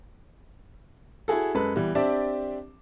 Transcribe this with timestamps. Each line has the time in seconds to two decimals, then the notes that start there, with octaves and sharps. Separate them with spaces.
1.28 E4 F#4 G#4 A4
1.54 F#2 G#3 A4 B4 B5
1.75 E3 G3 B3
1.95 C4 D4 G4 D5 E5 A5